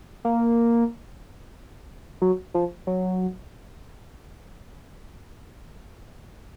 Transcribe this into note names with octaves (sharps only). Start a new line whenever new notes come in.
A#3
F#3
F3
F#3